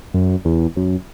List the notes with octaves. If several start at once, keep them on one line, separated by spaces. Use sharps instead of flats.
F#2
E2
F#2